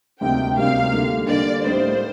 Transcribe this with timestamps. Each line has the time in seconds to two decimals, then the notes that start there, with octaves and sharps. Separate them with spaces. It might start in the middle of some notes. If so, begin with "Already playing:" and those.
0.21 D2 C3 G3 A#3 D#4 G5
0.57 D2 C3 G3 A#3 D#4 F5
0.93 D3 G3 A#3
1.29 D3 G3 A#3 D5
1.64 A2 G3 A#3 D#4 C5